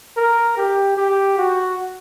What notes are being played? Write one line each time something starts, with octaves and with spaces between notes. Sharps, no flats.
A#4
G4
G4
F#4